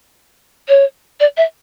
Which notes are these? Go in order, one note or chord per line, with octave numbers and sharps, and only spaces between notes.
C#5
D5
E5